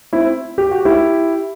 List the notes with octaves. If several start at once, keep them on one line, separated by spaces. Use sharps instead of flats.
C4 E4
G4
F#4
E4 G4